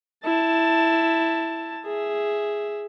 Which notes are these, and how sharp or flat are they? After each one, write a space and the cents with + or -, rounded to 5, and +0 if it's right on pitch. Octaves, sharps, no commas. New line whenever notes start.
E4 +0 A5 +10
G#4 +0 E5 +0